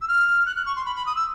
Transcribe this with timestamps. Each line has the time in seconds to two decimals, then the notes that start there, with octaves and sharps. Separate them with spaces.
0.01 E6
0.08 F6
0.46 F#6
0.56 F#6
0.66 C#6
0.76 C6
0.85 B5
0.96 B5
1.06 D#6
1.16 E6